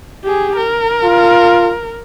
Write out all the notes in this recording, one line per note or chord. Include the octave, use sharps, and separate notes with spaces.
G4 G#4
A#4
F4